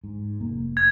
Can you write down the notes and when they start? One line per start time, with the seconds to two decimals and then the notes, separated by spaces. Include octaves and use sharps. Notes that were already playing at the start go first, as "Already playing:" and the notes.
0.04 G#2
0.41 F1 A#3
0.77 G#6